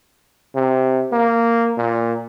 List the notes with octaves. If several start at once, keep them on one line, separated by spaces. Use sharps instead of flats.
C3
A#3
A#2